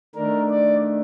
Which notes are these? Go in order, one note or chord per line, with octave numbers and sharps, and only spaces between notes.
D#3 A3 D4 A#4
D5